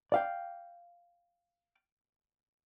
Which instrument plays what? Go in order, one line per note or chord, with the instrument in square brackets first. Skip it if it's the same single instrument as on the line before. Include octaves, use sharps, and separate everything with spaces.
[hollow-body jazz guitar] D5 F5 G5